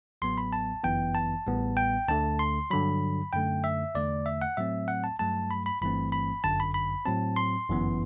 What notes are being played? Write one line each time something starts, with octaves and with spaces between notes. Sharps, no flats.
A1 A2 F#3 B3 C6
B5
A5
G1 F#2 E3 B3 G5
A5
A1 A2 G3 B3
G5
D2 D3 A3 A5
C6
G2 D3 F#3 B5
F#2 D3 A3 G5
E5
E2 D3 A3 D5
E5
F#5
A2 F#3 A3 C4 E5
F#5
A5
G2 F#3 A3 A5
B5
B5
G1 G2 E3 A3 C4 B5
B5
G1 F#2 D3 A5
B5
B5
A2 F#3 C4 A5
C6
G1 F#2 E3 B3